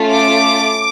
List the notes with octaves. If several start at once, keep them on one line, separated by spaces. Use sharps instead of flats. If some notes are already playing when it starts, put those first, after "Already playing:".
Already playing: A3 C#4 F4
D6